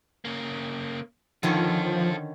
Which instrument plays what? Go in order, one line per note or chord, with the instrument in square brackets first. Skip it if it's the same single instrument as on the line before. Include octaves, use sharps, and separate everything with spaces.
[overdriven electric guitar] C#3 A#3
[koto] D3 D#3 C#4 [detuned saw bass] F3 [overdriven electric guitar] F4 A4